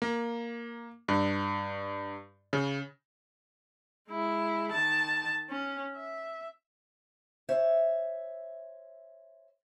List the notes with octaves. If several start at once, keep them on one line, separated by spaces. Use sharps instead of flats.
A#3
G2
C#3
G#3 E4
D#3 A5
C#4
E5
C5 C#5 E5